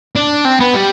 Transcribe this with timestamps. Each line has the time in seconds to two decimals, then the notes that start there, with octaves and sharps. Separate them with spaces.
0.16 D4
0.45 C4
0.60 B3
0.74 G3